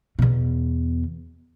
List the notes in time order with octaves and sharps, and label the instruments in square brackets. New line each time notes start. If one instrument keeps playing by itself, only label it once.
[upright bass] E2 B2